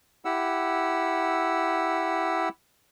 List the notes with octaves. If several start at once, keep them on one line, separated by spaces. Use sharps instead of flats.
E4 G4 F#5 E6